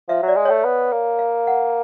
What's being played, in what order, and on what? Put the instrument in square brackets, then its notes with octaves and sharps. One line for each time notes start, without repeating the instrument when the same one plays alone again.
[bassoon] F3 [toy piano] E5
[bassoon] F#3
[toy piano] D5
[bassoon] G#3
[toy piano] C#5
[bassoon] A3
B3
A#3
[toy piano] F5
F#5